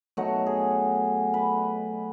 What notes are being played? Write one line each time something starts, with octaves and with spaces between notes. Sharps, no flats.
B2 F#3 A3 D#4 F#4
G#4
B4